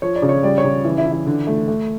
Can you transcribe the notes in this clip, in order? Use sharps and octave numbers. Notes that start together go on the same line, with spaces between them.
F3 C#5
D5
C#3
C#5
G3 D5
C#5
C#3
E3
E4
E3
E4
D3
A3
A3